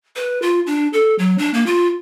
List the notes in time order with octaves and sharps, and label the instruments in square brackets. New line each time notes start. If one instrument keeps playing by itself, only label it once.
[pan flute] B4
F4
D4
A4
F#3
D4
A#3
F4